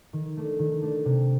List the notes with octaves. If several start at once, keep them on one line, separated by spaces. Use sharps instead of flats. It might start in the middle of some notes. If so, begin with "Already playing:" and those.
D#3
A3 D4
D#3
A3 D4
C3